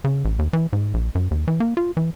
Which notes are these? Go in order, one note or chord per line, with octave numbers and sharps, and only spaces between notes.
C#3
A1
D#2
E3
G#2
A#1
F#2
D#2
E3
A#3
F4
E3